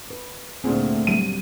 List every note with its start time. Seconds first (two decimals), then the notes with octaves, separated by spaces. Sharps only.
0.10 B4
0.64 D2 A#2 A3 C4 G#4
1.07 F#3 G3 D#7